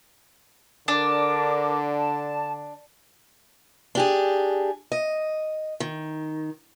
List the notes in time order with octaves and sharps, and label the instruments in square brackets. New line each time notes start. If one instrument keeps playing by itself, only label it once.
[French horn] D3 [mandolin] D4 [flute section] A#4 D6
[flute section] A5
[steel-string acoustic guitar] D4 G4 G#4
D#5
D#3